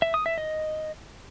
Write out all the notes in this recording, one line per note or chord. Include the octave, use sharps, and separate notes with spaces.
E5
D#6
E5
D#5